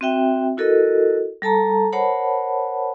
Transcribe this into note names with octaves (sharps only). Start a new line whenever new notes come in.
C4 F#4 E5 G5
E4 F#4 A4 A#4 D#5
G3 A4 A5 A#5
A#4 C5 C#5 F#5 A5 B5